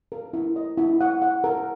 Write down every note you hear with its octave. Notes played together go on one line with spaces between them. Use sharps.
A#4
E4
D#5
E4
F#5
F#5
A#4